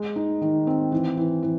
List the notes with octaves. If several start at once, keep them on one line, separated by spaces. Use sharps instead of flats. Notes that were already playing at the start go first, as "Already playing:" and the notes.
Already playing: G#3
D#4
D#3
C4
E3
E3
E3